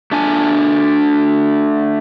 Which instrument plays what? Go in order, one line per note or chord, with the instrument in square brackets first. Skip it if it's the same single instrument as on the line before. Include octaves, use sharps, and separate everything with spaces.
[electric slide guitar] A3 D4 G#5